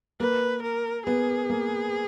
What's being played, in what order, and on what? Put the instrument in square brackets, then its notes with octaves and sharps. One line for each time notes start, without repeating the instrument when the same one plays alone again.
[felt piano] A#3 [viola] B4
[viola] A#4
[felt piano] B3 [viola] G#4
[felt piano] A#3